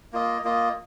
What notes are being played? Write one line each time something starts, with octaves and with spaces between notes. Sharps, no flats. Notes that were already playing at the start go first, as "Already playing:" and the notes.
A#3 F4 D#5
A#3 F4 D#5